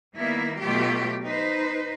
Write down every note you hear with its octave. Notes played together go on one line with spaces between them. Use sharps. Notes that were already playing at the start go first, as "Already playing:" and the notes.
D#3 G3 A#3 B3 E4
B2 F#3 A3 F4 G4
D#4 B4 C5